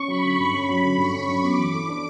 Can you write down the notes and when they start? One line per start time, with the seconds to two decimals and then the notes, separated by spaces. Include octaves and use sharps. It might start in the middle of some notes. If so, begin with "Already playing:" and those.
Already playing: C#4 C#6
0.08 F#3 B5
0.23 D3
0.38 G2
0.53 C#4
0.69 F#3
0.83 D3
0.98 G2 C#6
1.14 C#4
1.28 F#3
1.42 B3 D6
1.58 E3
1.73 A4
1.88 D4